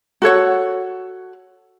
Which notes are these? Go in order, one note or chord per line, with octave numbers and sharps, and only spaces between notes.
F#4 A4 C#5 F#5